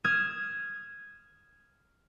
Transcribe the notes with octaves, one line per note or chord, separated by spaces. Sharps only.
D#6 F6 G#6 D#7 E7